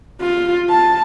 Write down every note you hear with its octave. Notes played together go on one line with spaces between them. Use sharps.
F4
A5